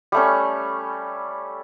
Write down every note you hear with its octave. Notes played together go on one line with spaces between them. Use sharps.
G3 A3 C#4